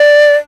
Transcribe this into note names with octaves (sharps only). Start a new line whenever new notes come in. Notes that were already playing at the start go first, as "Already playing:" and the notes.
Already playing: D5